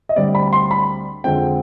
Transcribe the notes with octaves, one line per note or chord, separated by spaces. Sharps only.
D#5
D2 D3 G3 C4 D5
B5
C6
B5
F2 D3 G#3 C4 G5